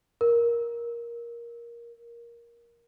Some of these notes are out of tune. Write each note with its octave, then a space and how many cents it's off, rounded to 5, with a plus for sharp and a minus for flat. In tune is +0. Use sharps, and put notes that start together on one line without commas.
A#4 +10